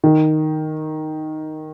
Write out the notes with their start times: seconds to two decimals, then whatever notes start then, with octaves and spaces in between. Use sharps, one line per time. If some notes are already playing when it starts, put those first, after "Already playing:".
0.04 D#3